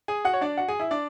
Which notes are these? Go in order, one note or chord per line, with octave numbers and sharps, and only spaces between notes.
G#4 G#5
F#4 F#5
C#5
D4 D5
F#4 F#5
G#4 G#5
E4 E5
D4 D5